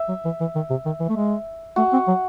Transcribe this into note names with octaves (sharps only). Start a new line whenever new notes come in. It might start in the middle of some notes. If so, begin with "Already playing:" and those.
Already playing: E5
F#3
E3
E3
D#3
C3
D#3
E3
A3
G#3
A3 F#4
C4
F#3